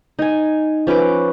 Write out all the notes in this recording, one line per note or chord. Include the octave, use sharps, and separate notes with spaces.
D#4 G#5
F3 C#4 B4 D6